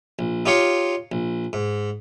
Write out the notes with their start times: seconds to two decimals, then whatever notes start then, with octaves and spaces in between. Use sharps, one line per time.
0.19 A#1
0.46 D#4 F4 G4 C#5 F5 C#6
1.12 A#1
1.53 G#2